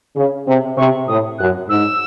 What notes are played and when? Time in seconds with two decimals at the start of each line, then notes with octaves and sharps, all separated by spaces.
0.16 C#3
0.47 C3
0.77 C3 C#6
1.08 A2 D#6
1.38 F#2 F#6
1.69 G#2 E6